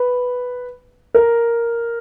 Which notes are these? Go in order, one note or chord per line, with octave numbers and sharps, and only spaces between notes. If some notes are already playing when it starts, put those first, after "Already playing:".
Already playing: B4
A#4